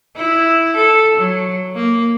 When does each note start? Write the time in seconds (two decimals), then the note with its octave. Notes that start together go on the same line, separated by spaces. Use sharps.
0.16 E4
0.77 A4
1.18 F#3
1.75 A#3